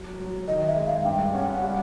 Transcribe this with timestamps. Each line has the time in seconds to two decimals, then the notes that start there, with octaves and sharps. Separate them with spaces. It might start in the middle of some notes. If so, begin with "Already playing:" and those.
Already playing: F#3
0.19 F#3
0.48 D#3 D#5
0.67 E5
0.76 G#3
0.86 F5
1.05 G2 G5
1.34 C#4 F#5
1.62 G3